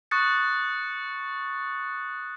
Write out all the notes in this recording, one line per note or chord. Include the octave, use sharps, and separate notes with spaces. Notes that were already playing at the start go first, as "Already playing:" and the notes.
C#6 D#6 F#6 A6 C#7